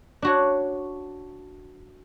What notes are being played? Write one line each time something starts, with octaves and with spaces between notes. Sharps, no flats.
D4 F#4 C#5